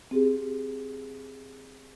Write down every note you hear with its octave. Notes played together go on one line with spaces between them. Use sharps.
C4 G4 G#4